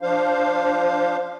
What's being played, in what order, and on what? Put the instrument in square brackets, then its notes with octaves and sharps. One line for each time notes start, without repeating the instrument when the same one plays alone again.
[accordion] F3 D4 C5 F5